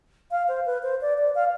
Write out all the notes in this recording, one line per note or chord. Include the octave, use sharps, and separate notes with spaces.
F5
C5
B4
C5
D5
D5
F5